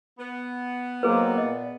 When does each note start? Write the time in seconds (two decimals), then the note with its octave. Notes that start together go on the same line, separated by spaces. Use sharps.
0.19 B3
1.03 F#3 A#3 C4 D#4 G#4 B4
1.38 A#2 D#5